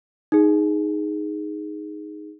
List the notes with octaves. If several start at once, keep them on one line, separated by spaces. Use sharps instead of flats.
D#4 G#4